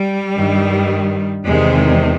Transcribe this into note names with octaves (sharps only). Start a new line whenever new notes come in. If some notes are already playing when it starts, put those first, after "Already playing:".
Already playing: G3
G2 D#3
E2 C3 D#3 G#3